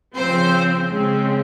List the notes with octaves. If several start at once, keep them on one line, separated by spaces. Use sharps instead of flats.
C#3 F3 C4 C5
C#3 G#3 C4